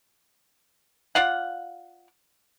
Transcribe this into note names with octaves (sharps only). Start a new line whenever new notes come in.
F4 D5 F5 F#5